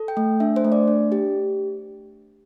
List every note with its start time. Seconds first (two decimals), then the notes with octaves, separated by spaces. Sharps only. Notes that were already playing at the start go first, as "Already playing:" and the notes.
Already playing: A4
0.08 G5
0.17 A3
0.40 D4 E5
0.56 C5
0.64 A3
0.72 D5
0.88 D4
1.12 G4